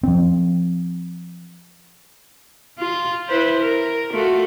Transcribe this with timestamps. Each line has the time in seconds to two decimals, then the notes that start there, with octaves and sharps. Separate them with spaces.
0.03 F3 C4
2.79 F4
3.28 E4 B4 C5
3.61 A#4
4.13 A3 F4 F#4